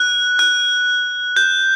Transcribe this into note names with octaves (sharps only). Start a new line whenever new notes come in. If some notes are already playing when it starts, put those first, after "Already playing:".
Already playing: F#6
F#6
G6